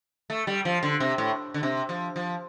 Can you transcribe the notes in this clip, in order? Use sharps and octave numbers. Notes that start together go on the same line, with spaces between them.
A3
G3
F3
D3
C3
A2
D3
C3
F3
F3